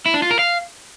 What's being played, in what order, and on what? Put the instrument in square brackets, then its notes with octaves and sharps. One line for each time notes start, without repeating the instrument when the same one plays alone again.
[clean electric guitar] E4
D4
F4
A#4
F5